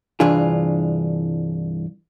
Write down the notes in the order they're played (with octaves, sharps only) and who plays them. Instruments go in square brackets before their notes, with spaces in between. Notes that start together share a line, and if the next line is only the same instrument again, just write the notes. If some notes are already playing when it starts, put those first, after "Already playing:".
[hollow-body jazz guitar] C2 G2 E3 D4 F4 G#4